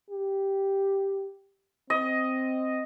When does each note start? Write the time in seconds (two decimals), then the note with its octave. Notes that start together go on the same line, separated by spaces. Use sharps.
0.11 G4
1.90 C4 D#5